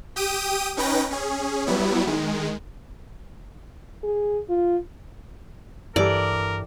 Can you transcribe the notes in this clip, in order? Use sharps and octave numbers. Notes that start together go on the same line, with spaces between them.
G4 G5 D#6 D#7
C#4 D#4 B4 G5 A#6
C#4 G#4
F#3 G3 B3 E4
D#3 G#3
G#4
F4
G2 E3 G3 A4 A#4 D5